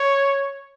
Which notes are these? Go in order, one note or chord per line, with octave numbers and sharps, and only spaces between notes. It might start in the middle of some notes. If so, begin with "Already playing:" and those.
Already playing: C#5